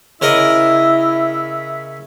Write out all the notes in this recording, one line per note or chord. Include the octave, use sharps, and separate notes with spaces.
C#3 E4 A#4 D#5 E5